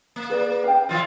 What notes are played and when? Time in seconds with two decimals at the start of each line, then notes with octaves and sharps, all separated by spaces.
0.16 A#3
0.30 G#4 B4 D5
0.64 F5 G5
0.89 D#3 E3 F4